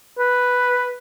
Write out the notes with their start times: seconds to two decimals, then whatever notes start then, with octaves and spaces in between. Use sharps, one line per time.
0.19 B4